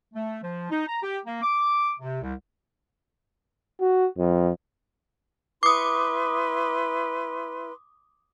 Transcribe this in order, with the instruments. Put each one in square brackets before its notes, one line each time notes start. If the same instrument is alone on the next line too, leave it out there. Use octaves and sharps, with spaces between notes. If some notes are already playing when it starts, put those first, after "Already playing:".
[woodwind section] A3
F3
D#4
A#5
G4
A#3
D6
C3
C2
[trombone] F#4
F2
[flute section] E4 B4 C6 [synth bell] D6 D#6